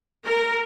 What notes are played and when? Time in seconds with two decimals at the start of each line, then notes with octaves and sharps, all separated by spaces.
0.25 A#4